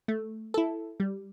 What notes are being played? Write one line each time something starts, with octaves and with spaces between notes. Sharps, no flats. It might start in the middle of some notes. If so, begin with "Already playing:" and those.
A3
E4 A4
G3